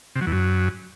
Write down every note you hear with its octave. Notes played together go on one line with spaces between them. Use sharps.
C3
F#3
E2
F#2